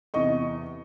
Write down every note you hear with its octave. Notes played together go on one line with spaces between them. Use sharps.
E2 C3 D#5 C#6